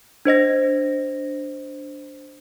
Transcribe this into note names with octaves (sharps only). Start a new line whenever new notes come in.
D4 C5 D#5 A#6